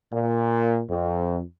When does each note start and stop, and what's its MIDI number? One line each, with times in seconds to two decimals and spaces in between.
0.12 0.82 46
0.89 1.39 41